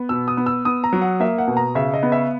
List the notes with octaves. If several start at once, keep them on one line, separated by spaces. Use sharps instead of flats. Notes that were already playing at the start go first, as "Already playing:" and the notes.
Already playing: B3
B2 E6
D#6
B3
E6
B3 D#6
A#5
F#3
F#5
A#3 E5
F#5
B2
A#5
C#3 E5
D#5
B3
E5